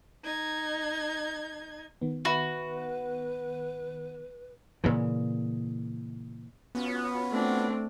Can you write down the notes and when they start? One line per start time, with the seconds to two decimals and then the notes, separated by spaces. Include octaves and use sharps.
0.24 D#4 G#6
2.02 D#3 B3
2.25 F#4 B4 E5 B5 C#6
4.84 A#2 C#3 E3
6.75 B3 C#4 F4 F#4
7.32 A3 C4 D4